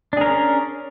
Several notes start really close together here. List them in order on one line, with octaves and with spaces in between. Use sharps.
D4 G#4 A#4 C#4